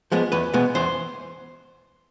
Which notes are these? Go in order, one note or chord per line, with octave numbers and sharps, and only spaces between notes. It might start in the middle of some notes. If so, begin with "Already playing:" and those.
F3 G#3 B3
E2 B4
B2 G#3 B3
E2 C5